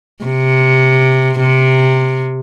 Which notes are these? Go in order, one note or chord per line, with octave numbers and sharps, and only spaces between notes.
C3
C3